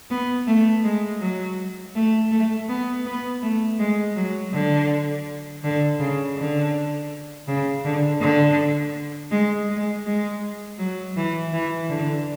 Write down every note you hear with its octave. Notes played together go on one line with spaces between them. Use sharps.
B3
A3
G#3
F#3
A3
A3
B3
B3
A3
G#3
F#3
D3
D3
C#3
D3
C#3
D3
D3
G#3
G#3
G#3
F#3
E3
E3
D3